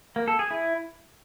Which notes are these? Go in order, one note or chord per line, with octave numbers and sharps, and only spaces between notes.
A#3
A4
G#4
E4